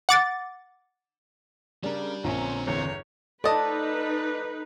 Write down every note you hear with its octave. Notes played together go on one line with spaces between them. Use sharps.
F#5 D6 A6
C#3 G3 D4 A#4
A#1 D3 C4 C#4 A#5
G1 E2 C#5
F3 D#4 A4 B4 D5 D#5 A5